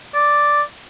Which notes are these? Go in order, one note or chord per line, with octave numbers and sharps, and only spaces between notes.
D5